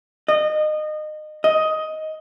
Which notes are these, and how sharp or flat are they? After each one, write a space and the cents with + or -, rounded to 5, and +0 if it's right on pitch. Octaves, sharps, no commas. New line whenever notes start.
D#5 -25
D#5 +10